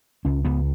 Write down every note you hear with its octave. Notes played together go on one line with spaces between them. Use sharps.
C#2 C#4
C#2 B3